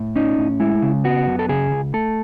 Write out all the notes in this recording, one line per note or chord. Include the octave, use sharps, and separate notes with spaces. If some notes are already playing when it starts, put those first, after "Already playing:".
Already playing: A2
C#4 D#4
A2
G#3 E4
C#3
B3 F#4
F#2
A4
C#3 G#4
C#2
A3 A4